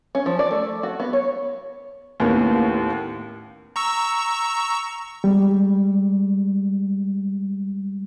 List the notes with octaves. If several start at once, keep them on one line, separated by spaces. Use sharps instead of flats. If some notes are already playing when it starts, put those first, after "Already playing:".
C#4
F3
D5
A3
F#4
B3
C#5
D#2 A2 B3 C#4
A#5 C#6 E6
G3 G#3